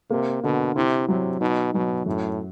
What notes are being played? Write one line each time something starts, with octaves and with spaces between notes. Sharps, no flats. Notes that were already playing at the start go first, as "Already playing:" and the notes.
C3 A#3
B2 D3
C3 E4
C3 F#3
B2 D#4
B2 F#3
F#2 A2